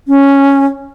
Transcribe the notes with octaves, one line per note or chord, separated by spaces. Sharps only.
C#4